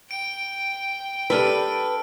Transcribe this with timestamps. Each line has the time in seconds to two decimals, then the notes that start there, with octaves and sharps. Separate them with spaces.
0.11 G5 D7
1.30 G3 D4 A4 B4 E6 F6